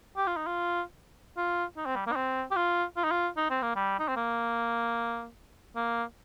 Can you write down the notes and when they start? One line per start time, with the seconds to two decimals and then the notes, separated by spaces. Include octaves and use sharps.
0.17 G4
0.27 F4
0.37 D#4
0.47 F4
1.37 F4
1.77 D#4
1.86 C4
1.96 G3
2.07 A#3
2.12 D#4
2.16 C4
2.51 G4
2.56 F4
2.97 F4
3.04 D#4
3.11 F4
3.36 D#4
3.50 C4
3.62 A#3
3.76 G3
4.00 D#4
4.08 C4
4.16 A#3
5.76 A#3